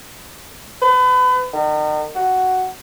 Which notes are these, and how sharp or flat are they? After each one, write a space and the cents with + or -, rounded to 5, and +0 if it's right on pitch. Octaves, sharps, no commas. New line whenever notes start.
B4 +35
D#3 -40
F#4 +5